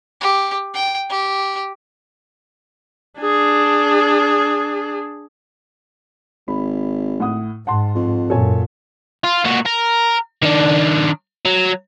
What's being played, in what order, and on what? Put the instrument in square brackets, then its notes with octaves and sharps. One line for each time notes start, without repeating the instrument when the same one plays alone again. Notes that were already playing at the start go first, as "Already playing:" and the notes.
[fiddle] G4
G5
G4
[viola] D4 G#4
[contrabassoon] G#1 [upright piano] B5
[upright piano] A2 F#5 D#6
[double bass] G#2 [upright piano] F#5 A5 C6
[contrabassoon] F2
[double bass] F#2 A#2 [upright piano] A4 C#5 G#5
[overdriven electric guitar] F4
A#2 F#4
A#4
D#3 D4
F#3